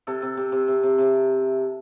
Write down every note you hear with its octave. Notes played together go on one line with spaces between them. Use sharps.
C3 A4
C3
C3
C3
C3
C3
C3